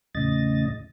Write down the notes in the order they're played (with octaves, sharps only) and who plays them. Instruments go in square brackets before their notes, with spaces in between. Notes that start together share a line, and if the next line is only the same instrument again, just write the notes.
[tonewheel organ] E2 A2 C#3 D#5 A6